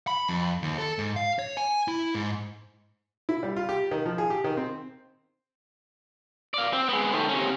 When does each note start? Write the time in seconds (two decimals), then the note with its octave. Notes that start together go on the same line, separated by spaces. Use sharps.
0.07 B5
0.29 F2
0.62 D#2
0.78 A4
0.98 G#2
1.16 F5
1.39 C#5
1.57 G#5
1.88 E4
2.15 G#2
3.29 E4
3.43 G3
3.56 F4
3.69 G4
3.91 D#3
4.06 F3
4.18 G#4
4.30 G4
4.44 D#3
4.57 C4
6.54 D5 F5
6.73 C4
6.89 G#3 B3
7.13 D#3 A3
7.29 C3 C#4